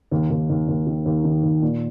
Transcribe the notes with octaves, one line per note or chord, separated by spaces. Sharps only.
D#2
D#2
D#2
D#2
D#3
D#2
D#3
D#2
A#2